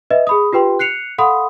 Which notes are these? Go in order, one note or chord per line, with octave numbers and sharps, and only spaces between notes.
B4 D#5 E5
G#4 B5 D#6
F4 G4 B4 G5 C6
F#6 C7 C#7 F7
A4 F5 F#5 B5 C6 D#6